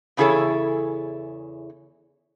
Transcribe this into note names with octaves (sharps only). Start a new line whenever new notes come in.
E2 C#3 E4 G#4 A4 C#5